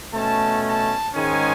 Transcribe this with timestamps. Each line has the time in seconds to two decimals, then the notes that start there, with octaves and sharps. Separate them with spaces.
0.14 B2 A3 C#4 A5
0.65 A5
1.15 G#2 D#3 G#3 C#4 G#5